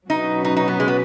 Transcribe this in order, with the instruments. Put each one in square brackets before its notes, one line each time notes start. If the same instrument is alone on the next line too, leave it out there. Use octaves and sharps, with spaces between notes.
[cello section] B2 F#3 C#4 F#4 B4 [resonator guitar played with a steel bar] D#4
[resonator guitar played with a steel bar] D#4
D#4
B3
G#3
B3